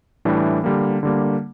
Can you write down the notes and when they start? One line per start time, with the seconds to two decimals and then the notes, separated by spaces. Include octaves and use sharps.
0.25 A2 E3 G3 D4 G4
0.64 D3 G3 A#3
1.03 D3 G3 A#3